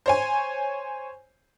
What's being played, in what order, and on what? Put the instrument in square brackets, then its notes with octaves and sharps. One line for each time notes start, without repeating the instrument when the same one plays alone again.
[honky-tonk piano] C5 C#5 G#5